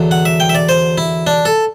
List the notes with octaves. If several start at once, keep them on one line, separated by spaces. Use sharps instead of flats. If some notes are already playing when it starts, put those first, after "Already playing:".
Already playing: E2 D3 F#3
F#5
E5
G5
E5
D5
C5
E4
D4
A4